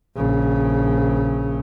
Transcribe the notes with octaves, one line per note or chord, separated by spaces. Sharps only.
A#1 C#3